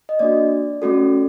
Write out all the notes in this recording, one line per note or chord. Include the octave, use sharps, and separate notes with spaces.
D#5
A#3 D4 F#4 D5
A3 C#4 F#4 A4